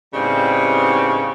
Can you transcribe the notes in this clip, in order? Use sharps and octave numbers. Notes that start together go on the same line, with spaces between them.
A2 C#3 G3 B3 C4 D#4